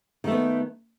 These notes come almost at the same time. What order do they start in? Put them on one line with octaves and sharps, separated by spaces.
D#3 A3 B3